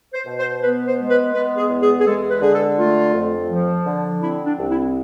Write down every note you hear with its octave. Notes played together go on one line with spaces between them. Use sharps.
C5
B2
C5
B3 B4
C5
G#3
B4
B3 B4
G#4
E2
G#4
G#4
G#3 A4
B4
D3 G#4
A4
A3 F4
F2
F3
D3
C4 E4
D4
C2
E4